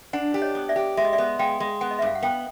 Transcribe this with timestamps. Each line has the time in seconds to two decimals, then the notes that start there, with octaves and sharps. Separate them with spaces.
0.13 D4 F#5 G#5
0.34 G4
0.42 C#5 D#5
0.55 B3
0.69 D5 E5
0.76 G4
0.97 G#3 E5
1.05 D#5
1.13 D5 E5
1.18 B3
1.39 G#3 F5 G5
1.60 G#3
1.81 B3 F#5 G#5
1.91 D#5
1.99 E5
2.02 G2 F5
2.15 F#5
2.23 B3 F5 G5